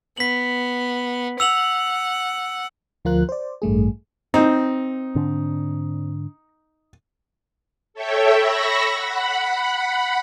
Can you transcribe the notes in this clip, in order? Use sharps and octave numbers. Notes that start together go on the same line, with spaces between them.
B3 B6 F#7
F#5 E6 F7 F#7
D2 F3 F4 A#4 F#6
C5 D5
A1 G2 A3 G#4
C4 D#4
G#2 D3 D4
A4 C#5 E5 G5
B5 C#6 E6 A#6
F#5 B5